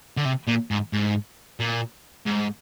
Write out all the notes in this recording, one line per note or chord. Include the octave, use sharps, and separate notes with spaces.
D3
C3
A#2
G#2
G#2
A#2
G#2